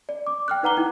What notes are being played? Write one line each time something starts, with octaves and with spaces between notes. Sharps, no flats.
D5
D6
G5 F6 F#6
D#4 B4 F#5 A#5 D6 G7
D#4 E4 G5